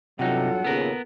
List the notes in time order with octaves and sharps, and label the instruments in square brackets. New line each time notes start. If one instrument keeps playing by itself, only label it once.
[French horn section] E2 G2 F#3 [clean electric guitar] C3 D#4 [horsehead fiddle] F4 A4 [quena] F#5
[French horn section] D#2 A#2 C#3 [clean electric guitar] B3 A#4